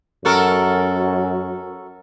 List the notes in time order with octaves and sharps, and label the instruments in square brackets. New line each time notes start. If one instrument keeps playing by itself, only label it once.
[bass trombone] F#2 [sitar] F#4 A4 A#4